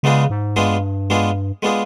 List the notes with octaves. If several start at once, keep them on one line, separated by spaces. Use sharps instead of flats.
C#3 G#3 B3 D4 F4 G#4
G#2
G2 G#3 B3 D4 F4 G#4
G#3 B3 D4 F4 G#4
G#3 B3 D4 F4 G#4